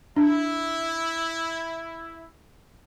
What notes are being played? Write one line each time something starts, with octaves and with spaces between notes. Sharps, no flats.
D4 E4